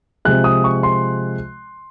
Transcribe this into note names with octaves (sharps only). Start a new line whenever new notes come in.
C3 F3 G#3 F#6
D#6
C#6
C6